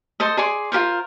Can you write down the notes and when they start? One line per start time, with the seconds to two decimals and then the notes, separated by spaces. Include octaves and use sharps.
0.20 A4 C5 D#5
0.37 G#4 D5 C6
0.72 F4 G4 A#4 C5